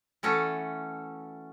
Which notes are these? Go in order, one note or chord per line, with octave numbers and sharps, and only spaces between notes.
E3 A3 C#4 F#4 A4